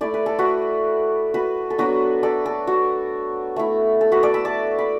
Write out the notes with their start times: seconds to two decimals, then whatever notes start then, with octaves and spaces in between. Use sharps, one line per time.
0.01 A3 E4 D5
0.14 B4
0.26 A4
0.39 F#4 B4
1.34 F#4 B4
1.70 A4
1.78 F#3 B3 D4 F#4 B4
2.23 A4 D5
2.46 A4
2.67 F#4
3.56 A3 E4
4.01 A4
4.12 F#4 B4
4.23 A4 D5
4.34 B5 E6
4.45 A5 D6
4.79 B5